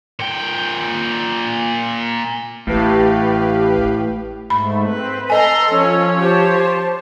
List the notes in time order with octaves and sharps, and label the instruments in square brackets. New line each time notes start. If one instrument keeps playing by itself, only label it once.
[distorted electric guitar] A#2 G5
[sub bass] A1 [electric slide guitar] A2 [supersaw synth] G4 B4 F5
[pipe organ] G#2 A3 [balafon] B5
[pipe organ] C4 [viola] B4
[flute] A4 [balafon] D#5 G#5 [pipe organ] A#5 C6
[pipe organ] F3 C#5 [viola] C#4
[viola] G4 A5 [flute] C5